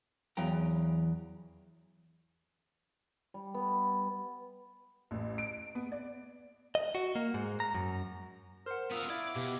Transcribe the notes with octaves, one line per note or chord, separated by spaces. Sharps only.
E2 E3 F#3 F5 G5 A#5
G3
B3
A1
D7
B3
D5
D#5
F#4
A#3
G#2
A#5
F#2
A#4 C5 F#5
B3 F4 A#4 D#6 E6
E4 D5 F5 G#6
B2 G4